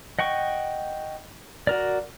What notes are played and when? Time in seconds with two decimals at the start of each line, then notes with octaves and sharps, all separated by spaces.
0.19 D#5 F#5 G5 C#6
1.67 F#4 A#4 D5